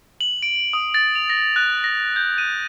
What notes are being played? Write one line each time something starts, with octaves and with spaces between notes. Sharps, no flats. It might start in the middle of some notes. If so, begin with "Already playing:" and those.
F#7
D7
D#6
A6
F7
A#6
F#6
A#6
G6
D#7